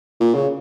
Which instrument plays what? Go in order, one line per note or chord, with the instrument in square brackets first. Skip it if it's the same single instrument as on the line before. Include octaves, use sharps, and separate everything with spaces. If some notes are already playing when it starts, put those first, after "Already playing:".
[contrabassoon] A#2
C#3